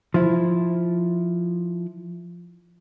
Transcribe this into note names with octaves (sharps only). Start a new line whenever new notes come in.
F3 E4